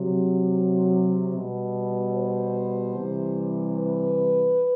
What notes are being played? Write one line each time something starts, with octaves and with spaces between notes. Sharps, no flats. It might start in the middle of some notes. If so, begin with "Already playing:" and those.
Already playing: C3 F#3
B2 G3
C5
C3 E3 G3
B4